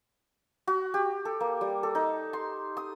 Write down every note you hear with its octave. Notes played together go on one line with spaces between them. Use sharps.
F#4
G4
A4
A#3
G3
A4
D#4
C6
D#6